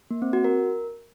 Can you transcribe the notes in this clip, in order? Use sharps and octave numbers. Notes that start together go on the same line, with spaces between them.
A#3
C4
F#4
A#4